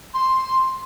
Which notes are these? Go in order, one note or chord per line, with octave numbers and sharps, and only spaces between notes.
C6